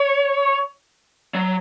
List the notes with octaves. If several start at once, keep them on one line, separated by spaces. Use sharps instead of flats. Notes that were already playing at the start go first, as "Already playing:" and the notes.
Already playing: C#5
F#3